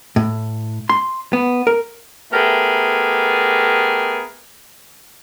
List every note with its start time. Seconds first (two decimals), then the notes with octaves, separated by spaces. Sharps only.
0.16 A2
0.89 C6
1.33 B3
1.67 A#4
2.33 A3 B3 G4 G#4 A#4